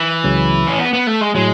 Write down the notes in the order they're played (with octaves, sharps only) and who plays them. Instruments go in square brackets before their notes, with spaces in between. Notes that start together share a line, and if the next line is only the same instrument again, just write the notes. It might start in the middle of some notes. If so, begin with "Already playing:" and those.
Already playing: [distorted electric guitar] E3
[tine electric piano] C#2 C#3 F#3
[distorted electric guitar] C#4
B3
B3
A3
G#3
[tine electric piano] A2 F#3 [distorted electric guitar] G#3